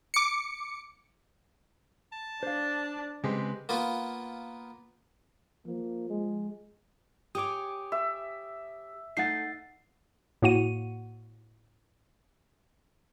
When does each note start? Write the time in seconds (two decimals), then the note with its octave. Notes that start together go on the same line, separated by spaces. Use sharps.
0.14 D6 C#7
2.12 A5
2.43 D4 C5 F5
3.24 C#3 G#3 C4 G4 B4
3.69 A#3 B3 F4
5.66 F3 A#3
6.10 G#3
7.35 G4 C#5 G#5 D6 D#6
7.92 E5
9.17 A3 D#4 F#5 A6 C7
10.42 A2 A#3 F#4 F#5 D#7